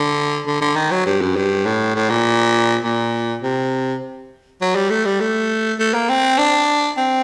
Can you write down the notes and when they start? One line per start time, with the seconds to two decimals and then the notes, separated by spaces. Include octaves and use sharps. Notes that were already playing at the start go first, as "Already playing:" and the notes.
Already playing: D3
0.47 D3
0.61 D3
0.76 D#3
0.91 F#3
1.06 G2
1.21 F#2
1.36 G2
1.66 A2
1.95 A2
2.10 A#2
2.83 A#2
3.42 C3
4.61 F#3
4.75 G3
4.90 A3
5.05 G3
5.20 A3
5.79 A3
5.94 A#3
6.09 C4
6.38 D4
6.97 C4